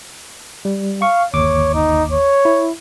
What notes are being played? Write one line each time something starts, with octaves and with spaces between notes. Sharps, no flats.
G3
F5 C#6
G1 D#2 C#5 D6
D#4
C#5
E4